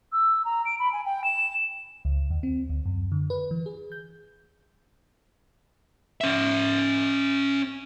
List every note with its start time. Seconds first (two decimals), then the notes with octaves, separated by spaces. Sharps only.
0.12 E6
0.45 A#5
0.65 D7
0.79 B5
0.93 G#5
1.05 G5
1.24 E7
2.05 C#2
2.31 D#2
2.43 C4
2.69 D2
2.86 F#2
3.12 D3
3.30 B4
3.51 E3
3.66 G#4
3.92 G6
6.21 C#4 E5